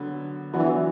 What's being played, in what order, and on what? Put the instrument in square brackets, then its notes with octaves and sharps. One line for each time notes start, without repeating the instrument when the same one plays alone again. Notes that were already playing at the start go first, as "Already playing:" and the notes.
Already playing: [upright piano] D3 F#3 B3
[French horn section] E3 [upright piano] F#3 B3 D4 F#4